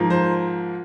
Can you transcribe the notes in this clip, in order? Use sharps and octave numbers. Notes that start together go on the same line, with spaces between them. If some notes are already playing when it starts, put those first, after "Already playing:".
Already playing: G#2 F3 A#3
C5